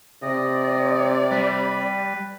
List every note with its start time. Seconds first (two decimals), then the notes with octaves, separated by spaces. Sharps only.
0.23 C3 D5 D#5
1.31 G3 B4